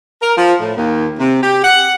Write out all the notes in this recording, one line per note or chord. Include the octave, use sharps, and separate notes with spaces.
A#4
F3
A2
D#2
C3
G4
F#5